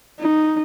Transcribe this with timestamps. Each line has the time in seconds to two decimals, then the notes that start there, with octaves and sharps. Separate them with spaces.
0.20 D#4